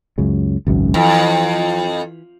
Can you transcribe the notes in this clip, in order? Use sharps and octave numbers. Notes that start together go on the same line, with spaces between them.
C#2 F#2 C#3
G#1 C#2 F#2
F2 E3